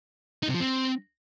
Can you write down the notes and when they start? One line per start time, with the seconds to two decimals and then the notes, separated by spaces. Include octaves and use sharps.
0.43 D#4
0.49 C3
0.54 F3
0.60 C4